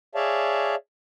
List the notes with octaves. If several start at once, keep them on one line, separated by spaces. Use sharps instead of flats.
G#4 C#5 D5 E5 F5 A5